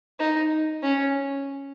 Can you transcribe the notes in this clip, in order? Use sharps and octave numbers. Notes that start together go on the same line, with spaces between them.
D#4
C#4